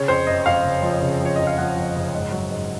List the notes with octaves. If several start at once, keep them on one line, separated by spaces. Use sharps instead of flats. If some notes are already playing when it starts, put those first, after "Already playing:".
Already playing: C#3 C#5
F2 C5
F#1 D#5
F2 F5
F#1
F3
C#3
F3
C#5
F2 D#5
F5
F3 F#5
F2
F#1
G#2
F#3
G#2